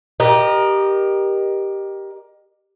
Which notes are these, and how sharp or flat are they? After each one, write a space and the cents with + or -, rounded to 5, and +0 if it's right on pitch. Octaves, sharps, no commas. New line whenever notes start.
G4 +0 A#4 +20 D#5 -25